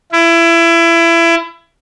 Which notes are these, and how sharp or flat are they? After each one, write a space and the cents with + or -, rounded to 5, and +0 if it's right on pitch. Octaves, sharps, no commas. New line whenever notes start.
E4 +25